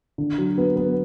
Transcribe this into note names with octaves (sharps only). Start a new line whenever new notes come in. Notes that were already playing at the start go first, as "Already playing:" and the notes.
D3
F#3
B3
B3